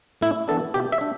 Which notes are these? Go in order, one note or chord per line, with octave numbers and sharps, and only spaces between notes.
A2 E4
E3 B3 D4 A4
B2 G4
E5
D4